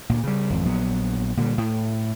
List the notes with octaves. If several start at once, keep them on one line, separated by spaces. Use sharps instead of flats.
D2 A#2
C#3 G3
G#1 F2
A#1 F#3 B3
A#2 D3 E3 G3
A2